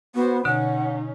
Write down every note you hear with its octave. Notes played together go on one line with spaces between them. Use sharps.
B3 F#4 C5
B2 D3 C#4 D#4 F#5